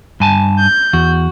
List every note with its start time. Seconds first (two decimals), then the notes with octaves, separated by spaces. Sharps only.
0.20 G2 G#5 A5
0.59 G6
0.93 E2 F#4